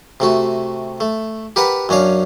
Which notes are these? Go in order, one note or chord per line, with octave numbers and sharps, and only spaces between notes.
C3 A3 F#4
A3
G4 A#4 B4 F#5 A5 B5
F#2 C#4 D4 F5